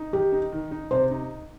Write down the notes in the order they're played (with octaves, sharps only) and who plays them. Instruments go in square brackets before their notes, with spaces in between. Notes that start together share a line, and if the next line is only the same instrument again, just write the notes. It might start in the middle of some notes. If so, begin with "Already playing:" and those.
Already playing: [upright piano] D#4
[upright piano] D#3 [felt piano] G4
[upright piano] D#4
D#3
D#4
[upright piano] C3 [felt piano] C5
[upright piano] D#4